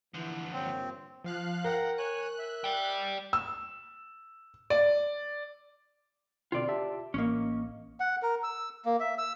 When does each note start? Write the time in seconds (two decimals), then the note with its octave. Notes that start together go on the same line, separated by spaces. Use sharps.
0.14 D3 E3 F3
0.53 G2 A#2 C4 C#5
1.24 F3 F5 F#6
1.65 A#4 F#5 G5 A#5
1.98 C#5 G#5 F#6
2.38 E5
2.64 D5 G5
3.33 E6
4.70 D5
6.52 B2 D3 C4 F4 D5
6.68 G4 E5 A5
7.14 A1 A#3 C#4 D#5
8.00 F#5
8.22 A#4
8.43 E6
8.85 A#3
9.00 E5
9.18 E6